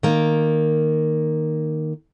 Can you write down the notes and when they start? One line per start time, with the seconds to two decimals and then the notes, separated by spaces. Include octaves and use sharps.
0.03 D#3 A#3